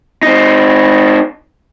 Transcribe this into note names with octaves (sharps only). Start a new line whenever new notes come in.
C4 D#4